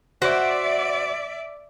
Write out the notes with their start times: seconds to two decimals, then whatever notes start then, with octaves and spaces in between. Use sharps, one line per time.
0.22 F#4 C5 D5 E5